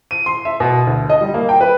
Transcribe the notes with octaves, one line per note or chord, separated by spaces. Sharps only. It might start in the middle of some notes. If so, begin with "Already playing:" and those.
D#7
C6
E5
B2
D2
D#5
G3
A#3
G5
B4